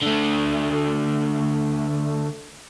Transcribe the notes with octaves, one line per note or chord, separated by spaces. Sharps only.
D3 A3